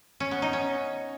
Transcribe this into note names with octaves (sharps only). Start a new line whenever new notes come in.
C#4
B3
D#4
C#4